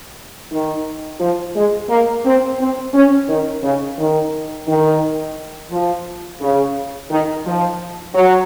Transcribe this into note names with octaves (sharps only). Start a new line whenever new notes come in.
D#3
F3
G#3
A#3
C4
C4
C#4
D#3
C#3
D#3
D#3
F3
C#3
D#3
F3
F#3